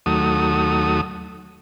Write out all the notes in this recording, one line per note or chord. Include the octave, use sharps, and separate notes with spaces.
D#2 F#3 A3 D#6